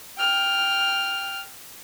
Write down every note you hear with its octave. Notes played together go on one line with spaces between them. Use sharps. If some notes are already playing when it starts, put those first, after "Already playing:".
G5 F6